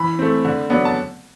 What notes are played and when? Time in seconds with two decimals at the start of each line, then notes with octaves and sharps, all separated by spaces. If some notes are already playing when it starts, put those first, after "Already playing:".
Already playing: E3 B5
0.19 A3 C4
0.45 D3
0.70 F#3 B3 D4
0.85 A5